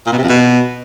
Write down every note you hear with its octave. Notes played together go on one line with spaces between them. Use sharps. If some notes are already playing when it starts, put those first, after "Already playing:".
A#2
B2
C3
F2
B2